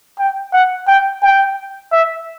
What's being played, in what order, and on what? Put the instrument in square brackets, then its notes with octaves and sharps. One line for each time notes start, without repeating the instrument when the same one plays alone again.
[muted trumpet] G5
F#5
G5
G5
E5